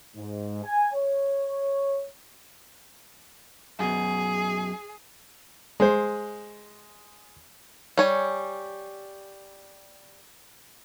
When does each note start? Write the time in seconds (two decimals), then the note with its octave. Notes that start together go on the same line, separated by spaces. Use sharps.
0.16 G#2
0.64 G#5
0.94 C#5
3.79 F#2 B2 G#4
5.80 G#3 C5
7.98 G3 C#5 G#5